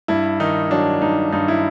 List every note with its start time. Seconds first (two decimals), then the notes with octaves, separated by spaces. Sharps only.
0.08 G2 E4
0.40 D#3 D#4
0.71 F#3 D4
1.02 G2 D#4
1.32 G2 D#4
1.48 E4